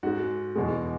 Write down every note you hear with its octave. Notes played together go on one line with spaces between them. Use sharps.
G#2 G#3 F#4
E2 B2 G#3